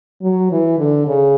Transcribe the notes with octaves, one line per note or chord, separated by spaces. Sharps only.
F#3
E3
D3
C#3